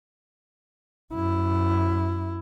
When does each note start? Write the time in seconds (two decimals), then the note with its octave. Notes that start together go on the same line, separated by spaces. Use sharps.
1.13 F#2 E4